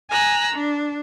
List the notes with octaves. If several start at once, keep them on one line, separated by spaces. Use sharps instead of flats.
G#5 A#5 E6 F#6
D4